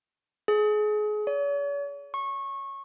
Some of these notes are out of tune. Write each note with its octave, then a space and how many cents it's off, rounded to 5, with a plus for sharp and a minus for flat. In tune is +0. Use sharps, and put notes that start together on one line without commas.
G#4 +30
C#5 +45
C#6 -20